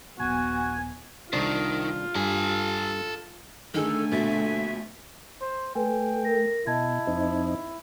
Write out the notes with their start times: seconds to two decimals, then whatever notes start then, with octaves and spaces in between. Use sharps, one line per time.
0.20 D#1 A#1 B3 F#4 G#5
1.33 C2 D#3 D4 F4 C5
2.15 G2 A4 G#5
3.74 D3 D#3 A3 G#4 A4 G#5
4.11 A#1 B2 E5 A6
5.41 C5
5.75 A3 B4 G5 G#5
6.25 A#4 A#6
6.67 B2 E4 D#5 A5 G#6
7.07 F2 C4 D#4